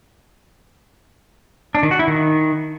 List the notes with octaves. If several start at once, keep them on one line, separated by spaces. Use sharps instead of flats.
D4
D#3
F#4
E4
D#3